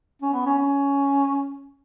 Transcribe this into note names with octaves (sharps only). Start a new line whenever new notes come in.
C#4
B3
C#4
C#4